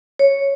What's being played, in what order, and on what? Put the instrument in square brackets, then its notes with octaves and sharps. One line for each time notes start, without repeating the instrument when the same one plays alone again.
[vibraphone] C#5